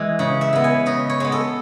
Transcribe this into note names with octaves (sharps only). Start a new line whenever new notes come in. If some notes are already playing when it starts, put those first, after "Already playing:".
Already playing: E3 G#3
C#3
E5
G#3 B3
G#5
C#3 D#5
C#5
G#3 B3
A4